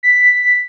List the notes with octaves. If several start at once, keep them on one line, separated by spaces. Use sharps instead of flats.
B6